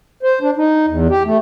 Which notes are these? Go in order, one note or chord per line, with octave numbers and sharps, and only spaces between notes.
C5
D4
D#4
E2
G4
A3